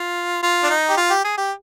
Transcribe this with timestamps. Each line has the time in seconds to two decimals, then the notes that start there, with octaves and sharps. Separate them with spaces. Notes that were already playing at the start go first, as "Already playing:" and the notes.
Already playing: F4
0.43 F4
0.64 D4
0.70 D#4
0.89 G4
0.97 F4
1.10 G4
1.24 G#4
1.37 G4